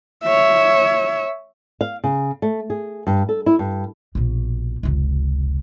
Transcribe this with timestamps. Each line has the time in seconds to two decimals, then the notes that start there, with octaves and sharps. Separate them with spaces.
0.23 C#5 E5
1.81 F5
2.04 C#3
2.42 A3
2.70 G#4
3.07 G2
3.29 A4
3.46 E4
3.59 G2
4.15 A#1 B2
4.83 F1 C#2